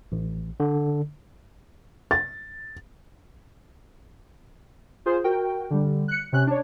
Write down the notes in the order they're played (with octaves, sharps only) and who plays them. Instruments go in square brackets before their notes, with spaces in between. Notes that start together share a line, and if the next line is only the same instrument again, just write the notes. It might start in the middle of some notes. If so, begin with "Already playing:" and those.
[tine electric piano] A1
D3
[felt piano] A6
[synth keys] F4 G#4 C5
F#4 A#4 G5
D3 G3
F#6 C#7
C3 C#4 F#6
D4 C#5